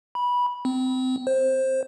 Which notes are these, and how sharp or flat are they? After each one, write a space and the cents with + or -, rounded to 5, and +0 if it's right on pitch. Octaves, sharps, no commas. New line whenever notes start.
B5 -15
C4 -25
C5 +15